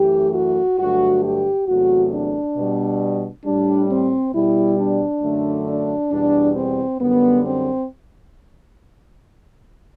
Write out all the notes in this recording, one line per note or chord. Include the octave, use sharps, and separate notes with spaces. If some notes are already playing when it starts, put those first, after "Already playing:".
Already playing: F#2 E3 A3 G4
F#4
G2 D3 F#3 A3 F#4
G4
E2 C3 F#3 A3 F#4
D4
B2 G3
A2 G3 D4
C4
B2 G3 E4
D4
F#2 D3 F#3 A3
D4
E2 B2 G3 D4
C4
F#2 D3 G3 B3
C4